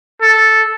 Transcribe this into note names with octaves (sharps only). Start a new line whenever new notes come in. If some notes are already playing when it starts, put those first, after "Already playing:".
A4